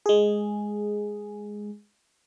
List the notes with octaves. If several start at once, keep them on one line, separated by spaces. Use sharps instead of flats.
G#3 G#4